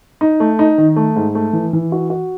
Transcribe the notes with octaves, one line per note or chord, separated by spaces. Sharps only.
D#4
A3
D#4
D#3
A3
G#2
A3
E3
E3
F#4
F#4